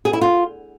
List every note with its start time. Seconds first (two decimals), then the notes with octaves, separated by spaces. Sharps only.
0.05 G#4
0.13 E4
0.21 F4